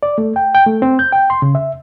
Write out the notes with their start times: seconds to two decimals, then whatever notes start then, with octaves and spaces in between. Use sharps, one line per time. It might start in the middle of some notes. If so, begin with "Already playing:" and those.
0.03 D5
0.18 A3
0.36 G5
0.55 G5
0.67 A3
0.82 C4
0.99 G6
1.12 G5
1.30 C6
1.42 C#3
1.55 E5